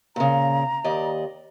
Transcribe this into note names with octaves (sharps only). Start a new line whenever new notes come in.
A#2 C#3 A#5
D#2 D5 D#5